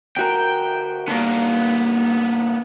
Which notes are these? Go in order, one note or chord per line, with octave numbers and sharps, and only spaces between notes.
D2 F#4 A#4 G5
G2 A#2 D3 A#3 B3